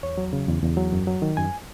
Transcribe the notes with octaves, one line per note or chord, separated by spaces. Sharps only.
E2 C#5
F#3
C#3
E2
E2
F#3
F#2
F#3
D#3
F#2 G#5